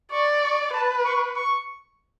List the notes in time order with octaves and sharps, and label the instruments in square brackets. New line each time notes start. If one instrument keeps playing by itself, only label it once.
[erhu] D5 [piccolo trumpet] C#6
[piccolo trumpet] C#6
[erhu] B4 [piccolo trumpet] A5
[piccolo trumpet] C#6
C#6